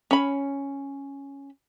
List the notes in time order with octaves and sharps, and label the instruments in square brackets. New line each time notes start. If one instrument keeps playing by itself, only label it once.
[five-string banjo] C#4 B5